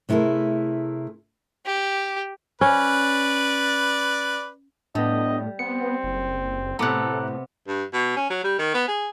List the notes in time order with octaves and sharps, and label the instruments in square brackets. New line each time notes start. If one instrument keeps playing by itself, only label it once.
[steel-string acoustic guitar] C3 A3 E4 G#4 A#4
[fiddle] G4
[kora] C#4 [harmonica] B4 D5
[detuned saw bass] A2 [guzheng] G3 [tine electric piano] B3 D4 [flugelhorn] D#5
[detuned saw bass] B3 [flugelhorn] C4 [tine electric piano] C#7
[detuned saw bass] F#1
[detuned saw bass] A2 [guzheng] C3 B3 [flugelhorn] A4 [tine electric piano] A#5 D6 F#6
[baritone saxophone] G2
B2
C#4
F#3
G3
D#3
B3
G#4